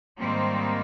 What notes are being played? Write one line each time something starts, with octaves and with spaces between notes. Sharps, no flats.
G#2 D#3 G3 A#3 C4